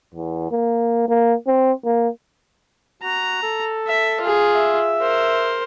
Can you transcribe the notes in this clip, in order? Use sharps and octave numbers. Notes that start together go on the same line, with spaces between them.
E2
A#3
A#3
C4
A#3
F#4 A#5
A4
E5
F4 G#4
E5
A#4 C5